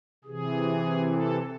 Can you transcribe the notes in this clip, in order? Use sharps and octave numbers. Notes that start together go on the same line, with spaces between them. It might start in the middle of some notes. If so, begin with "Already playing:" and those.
C3 E3 G#4
A4